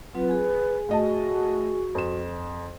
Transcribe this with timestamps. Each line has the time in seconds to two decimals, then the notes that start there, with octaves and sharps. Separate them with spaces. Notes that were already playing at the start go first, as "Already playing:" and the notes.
0.15 F#3 C4 F4 B4
0.29 G#4 G#5
0.89 A2 F#4 D#5 A5
1.95 F2 E7